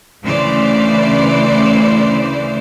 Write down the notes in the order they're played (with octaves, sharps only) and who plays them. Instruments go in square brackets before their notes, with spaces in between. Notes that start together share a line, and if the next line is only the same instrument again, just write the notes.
[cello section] D2 C#3 E3 A3 C5 D5